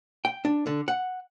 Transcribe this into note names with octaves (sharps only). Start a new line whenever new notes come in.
G5
D4
D3
F#5